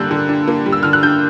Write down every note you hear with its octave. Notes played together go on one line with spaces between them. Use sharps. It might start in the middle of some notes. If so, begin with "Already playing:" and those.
Already playing: D3 G3 A#3 D4 E6 F#6 G6
D3
D4
A#3
G3
E6
D3 F6
F#6
D4 G6